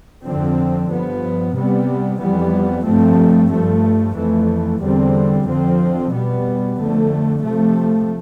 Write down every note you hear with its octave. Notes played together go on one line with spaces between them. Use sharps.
F2 D3 F3 C4
G2 F3 B3
C3 G3 B3
F2 E3 G3 B3
G2 F3 A3 C4
G2 F3 A3
F2 E3 A3
E2 D3 G3 C4
F2 D3 F3 C4
B2 G3 B3
F2 D3 A3
C3 F3 A3